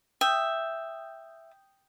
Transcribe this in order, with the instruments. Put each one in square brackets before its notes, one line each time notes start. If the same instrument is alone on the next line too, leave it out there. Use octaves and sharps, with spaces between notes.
[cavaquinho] E5 [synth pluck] G5 D#6 G6